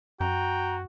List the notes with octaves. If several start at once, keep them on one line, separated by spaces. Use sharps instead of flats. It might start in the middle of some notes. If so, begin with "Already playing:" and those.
F#2 F#4 G5 A#5